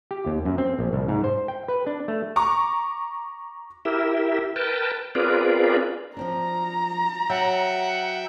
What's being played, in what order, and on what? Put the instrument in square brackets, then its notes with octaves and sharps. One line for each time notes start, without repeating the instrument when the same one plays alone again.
[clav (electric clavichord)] G4
D#2
F#2
C4
A#1
C2
G#2
C5
G5
B4
D4
A3
[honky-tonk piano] A#5 C#6 D6
[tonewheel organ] E4 G4 A#4 E5
A#4 B4 G5 A5
C4 F4 G#4 A#4 B4 D5
[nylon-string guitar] F3 C4 D4 [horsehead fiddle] A#5
[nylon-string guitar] F#3 [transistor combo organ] E5 G5 [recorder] F#5